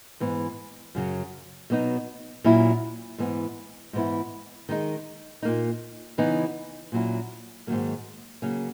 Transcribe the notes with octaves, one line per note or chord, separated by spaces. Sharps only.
G#2 E3 B3
F#2 C#3 F#3
B2 F#3 B3 D#4
A#2 F#3 C#4 E4
G#2 E3 B3
G#2 E3 B3 E4
D#3 G#3 B3 D#4
A#2 A#3 D#4
C#3 E3 B3 D#4
A#2 F#3 C#4 E4
G#2 D#3 F#3 A#3
C#3 F#3 A#3 C#4